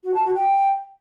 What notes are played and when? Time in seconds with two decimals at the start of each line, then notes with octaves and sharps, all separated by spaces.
0.04 F#4
0.14 A5
0.25 F#4
0.35 G5